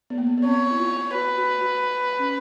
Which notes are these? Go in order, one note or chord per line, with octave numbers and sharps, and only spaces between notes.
B3
A#3
B3
B3
C4 C#5
E4
F4
F#4 B4
F#4
F#4
C#4